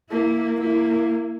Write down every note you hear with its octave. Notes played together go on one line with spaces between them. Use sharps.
A#3 E4
A#3 E4